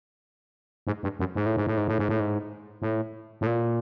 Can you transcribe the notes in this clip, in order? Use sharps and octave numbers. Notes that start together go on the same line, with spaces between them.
G#2
G2
F#2
G#2
A2
G#2
A2
G#2
A2
G#2
A2
G#2
A2
A2
A#2